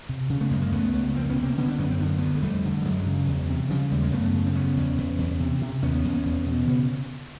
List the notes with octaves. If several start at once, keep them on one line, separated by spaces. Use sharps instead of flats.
C3
C#3
A3 B3
F#2 G#3 A#3
G#3 A#3
C#2 A3 B3
C#2
F2 A#3 C4
B3 C#4
C3
A#3 C4
D3 B3 C#4
C4 D4
F#2 B3 C#4
C4
D3 B3
A#3
D2 A3 B3
G#3
F2 G3 A3
D3
G3
F#2 F#3 G#3
C#3
E2
C3
C#3 F3 G3
D#2 G3 A3
G#3 A#3
F#2 A3 B3
C#3
C4
E2 B3 C#4
E2
E2
E2
C3
C3
D#2 B3 C#4
D#2
E2
B2
C#3 B3 C#4